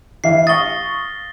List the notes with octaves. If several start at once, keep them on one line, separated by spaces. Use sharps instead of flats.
E3 E5 F5 C7
F5 C#6 D#6 A6 A#6 G7